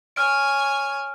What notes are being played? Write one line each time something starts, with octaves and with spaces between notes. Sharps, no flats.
C#5 G#5 F6 D7